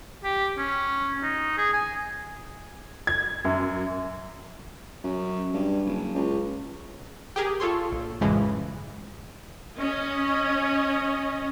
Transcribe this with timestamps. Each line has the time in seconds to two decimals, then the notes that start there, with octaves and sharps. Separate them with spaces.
0.24 G4
0.58 C#4
1.23 D#4
1.57 G#4
1.73 G#5
3.07 G#6
3.45 F#2
5.04 F#2
5.54 G2
5.85 F#1
6.14 C#2
7.36 G4 G#4 A#4
7.60 F4 A4 C#5 C6
7.92 A#1
8.21 F#2 A2 C#3 E3 F3 G#3
9.78 C#4 D#5